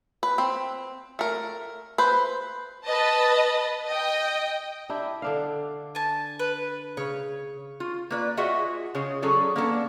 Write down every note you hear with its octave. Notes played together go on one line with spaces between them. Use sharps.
B4
C4
A3 A#4
B4 C5
B4 D#5 A5
D#5 G5
D4 E4 G4
D3 D4 F5
G#5 A5
B4
C#3 C#5
F4
A#3 B4 D5
F4 F#4 G#4 D#5 E5 F#5
C#3 F4 G#4 C#5
F#3 C#4 G#4 A4 D5
A#3 B3 C#4 D4 A4